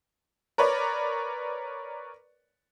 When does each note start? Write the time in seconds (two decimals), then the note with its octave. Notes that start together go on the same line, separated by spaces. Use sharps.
0.58 A#4 B4 C#5 D5